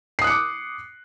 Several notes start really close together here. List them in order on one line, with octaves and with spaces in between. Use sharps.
C7 D#6 F#6 C#7 D6